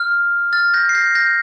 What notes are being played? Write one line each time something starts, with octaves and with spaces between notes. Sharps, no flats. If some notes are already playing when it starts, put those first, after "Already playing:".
Already playing: F6
F6 A6
G6 A#6
C7
G6 A#6
G6 A#6